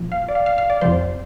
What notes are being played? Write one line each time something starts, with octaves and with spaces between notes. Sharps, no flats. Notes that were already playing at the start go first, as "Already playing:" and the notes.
Already playing: A#2 F3
F5
D5
F5
F5
F5
D5
F2 C3 F3 C5